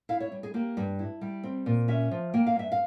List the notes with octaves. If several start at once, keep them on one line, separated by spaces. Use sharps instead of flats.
E4 F5
C#5
G3
G#4
A#3 G4
G2
E4
G3
C4
A#2
C#4 E5
F3
A#3 G5
F5
G2 E5
F5